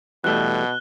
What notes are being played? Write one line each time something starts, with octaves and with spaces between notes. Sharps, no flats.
B2 E3 G3 A3 F#6 G7